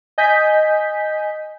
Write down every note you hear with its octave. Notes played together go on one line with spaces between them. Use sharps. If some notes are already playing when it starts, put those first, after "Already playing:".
D#5 G#5 G6 B6